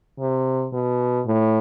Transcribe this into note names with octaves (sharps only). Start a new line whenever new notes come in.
C3
B2
A2